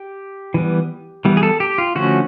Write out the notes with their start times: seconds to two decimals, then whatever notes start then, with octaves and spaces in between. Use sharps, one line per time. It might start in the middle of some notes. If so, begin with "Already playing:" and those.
Already playing: G4
0.54 E3 G3 B3
1.25 E3 G3 B3
1.37 G#4
1.43 A4
1.60 G4
1.78 F4
1.95 D3 F3 A3 C#4 F#4